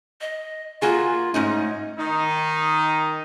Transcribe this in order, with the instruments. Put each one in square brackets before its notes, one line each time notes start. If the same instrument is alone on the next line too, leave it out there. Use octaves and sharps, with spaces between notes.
[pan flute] D#5
[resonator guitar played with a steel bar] A#3 F#4 G#4 [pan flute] F4
[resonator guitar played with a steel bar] G#2 C#4 D#4 [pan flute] A3
[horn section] D#3 D#4